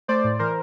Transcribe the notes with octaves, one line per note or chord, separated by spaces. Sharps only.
A3 C5 D5
A2
E3 A#4 C5